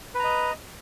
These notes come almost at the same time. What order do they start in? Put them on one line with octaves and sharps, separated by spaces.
B4 A#5 D#5